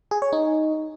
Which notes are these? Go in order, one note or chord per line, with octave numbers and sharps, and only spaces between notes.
G#4
C#5
D#4